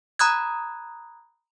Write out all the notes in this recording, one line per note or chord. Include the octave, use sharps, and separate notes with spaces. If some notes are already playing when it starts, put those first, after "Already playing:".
A#5 B5 D#6 F#6 G#6